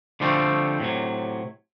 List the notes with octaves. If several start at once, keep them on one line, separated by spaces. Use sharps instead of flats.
D3 F3 G3 A3 C4
A2 C3 F#3